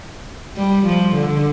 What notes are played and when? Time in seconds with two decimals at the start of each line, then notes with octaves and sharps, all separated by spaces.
0.57 G3
0.86 F3
1.15 D3